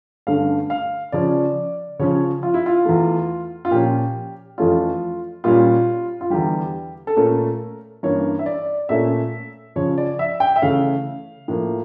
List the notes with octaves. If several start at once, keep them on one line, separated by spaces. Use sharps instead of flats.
G2 D3 A3 C#4 F5
F5
C#3 F3 C#4 D5
C#3 F3 C#4 C#5
F4
E4
F4
E2 E3 A3
F4
A#2 F3 C#4 G4
F2 E3 A3 C#4 F4
A#2 G3 C#4 F4
F4
E2 D3 G3 G4
A4
A#2 A3 C#4 A#4
G2 E3 A#3 C#4 C#5
E5
D5
A#2 A3 C#4 E5
C#3 F3 C#4 C#5
D5
E5
G5
E5
C#3 E3 A3 C#4 F5
A2 F3 A#3